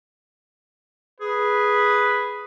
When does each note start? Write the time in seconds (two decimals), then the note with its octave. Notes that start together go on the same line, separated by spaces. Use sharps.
1.21 G#4 B4